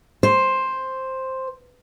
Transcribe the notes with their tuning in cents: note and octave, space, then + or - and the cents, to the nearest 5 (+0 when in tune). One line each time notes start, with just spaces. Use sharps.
C5 +5